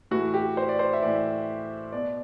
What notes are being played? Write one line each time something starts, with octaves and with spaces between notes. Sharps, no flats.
A2 E3 F#4
G4
C5
D5
C5
E5
A2 E3 D5
B2 D5